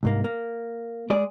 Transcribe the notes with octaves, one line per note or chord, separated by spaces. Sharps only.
C2 G#2 A#3
A#3
G#3 G#4 D5